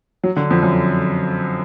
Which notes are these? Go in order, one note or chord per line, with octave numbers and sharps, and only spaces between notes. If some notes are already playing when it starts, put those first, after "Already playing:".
F#3
D3
F2
F#2